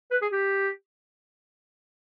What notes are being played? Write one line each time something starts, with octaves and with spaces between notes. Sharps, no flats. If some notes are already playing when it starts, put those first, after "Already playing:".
B4
G#4
G4